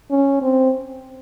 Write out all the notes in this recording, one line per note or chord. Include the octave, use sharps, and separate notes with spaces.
C#4
C4